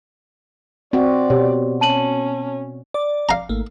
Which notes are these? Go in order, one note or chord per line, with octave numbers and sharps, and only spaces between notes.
C4 F#4 D5
B2 G4 C#5
C#4 A5 D#7 F#7
D5 D6
F5 A#5
G#1 A3 A#3